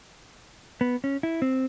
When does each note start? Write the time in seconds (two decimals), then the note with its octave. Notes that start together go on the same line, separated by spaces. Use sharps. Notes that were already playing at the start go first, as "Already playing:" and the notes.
0.81 B3
1.04 C#4
1.23 E4
1.42 C4